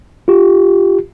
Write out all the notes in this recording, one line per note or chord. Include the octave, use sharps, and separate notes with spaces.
F4 G4